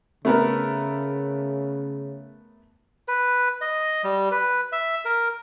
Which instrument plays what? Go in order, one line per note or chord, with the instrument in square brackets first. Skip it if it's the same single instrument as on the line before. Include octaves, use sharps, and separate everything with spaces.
[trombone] C#3 [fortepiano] A3 B3 A#4
[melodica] B4
D#5
G3
B4
E5
A#4